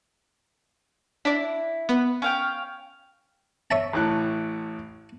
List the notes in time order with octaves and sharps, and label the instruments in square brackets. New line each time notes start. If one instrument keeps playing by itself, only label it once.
[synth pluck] D4 D5 [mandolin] E4
[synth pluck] B3
[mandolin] C#4 F5 G5
[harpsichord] C#5 E5 A5
[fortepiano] A1 A2 F#6